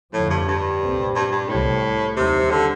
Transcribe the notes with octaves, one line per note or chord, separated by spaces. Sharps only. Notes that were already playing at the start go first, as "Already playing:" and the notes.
F2 A2 D3 F3
G2
G2
C2 A#2 A3 C4
G2
G2
C2 A2 C3 G3 C4
D#2 C3 D#3 G3
D3